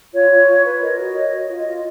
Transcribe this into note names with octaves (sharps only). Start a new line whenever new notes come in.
F4 C#5
F4
F4
B4
A#4 D#5
F#4
C#5
F#4
F4
F4